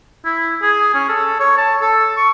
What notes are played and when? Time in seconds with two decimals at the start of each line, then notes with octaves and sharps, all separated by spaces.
0.25 E4
0.62 G#4
0.95 C#4
1.09 A4
1.40 C#5
1.58 A5
1.81 A4
2.17 C#6